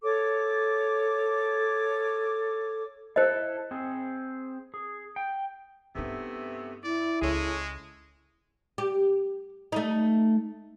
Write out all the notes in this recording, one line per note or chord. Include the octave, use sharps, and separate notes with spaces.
A4 C#5 D6
E4 A4 C5 D#5
C4 G#4
G#4
G5
G2 C3 A3 B3 D#4
E4 D5
C#2 G#3 G#4 A4 C#5
G4
A3 D#4